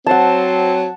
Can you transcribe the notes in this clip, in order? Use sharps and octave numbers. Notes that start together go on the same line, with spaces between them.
F#3 C4 F#5 A5